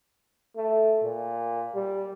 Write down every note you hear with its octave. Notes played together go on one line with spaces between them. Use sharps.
A3
A#2
G3